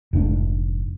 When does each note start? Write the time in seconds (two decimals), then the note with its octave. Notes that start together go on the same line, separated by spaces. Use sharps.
0.13 F1 G#2 C4 D4